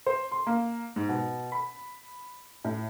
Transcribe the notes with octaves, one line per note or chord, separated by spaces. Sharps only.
C5
C6
A#3
G#2
B2
B5
A2